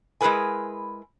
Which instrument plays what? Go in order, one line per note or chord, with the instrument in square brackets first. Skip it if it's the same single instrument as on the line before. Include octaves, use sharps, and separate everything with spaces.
[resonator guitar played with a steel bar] G#3 E4 G#4 A#4 B4 G#5